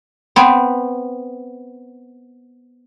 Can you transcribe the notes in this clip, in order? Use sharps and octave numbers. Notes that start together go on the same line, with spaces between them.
B3 C4